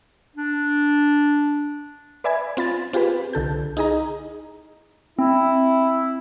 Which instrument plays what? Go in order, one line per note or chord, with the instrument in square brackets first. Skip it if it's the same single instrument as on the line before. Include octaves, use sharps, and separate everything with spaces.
[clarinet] D4
[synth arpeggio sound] B4 D5 E5 G#5 B5 G#6
C4 F4 B5 A6
C4 F4 G4 G#4 B4
C2 D3 A4 G6
D#4 E4 G#4 D#5 A#5
[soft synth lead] C4 [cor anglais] E4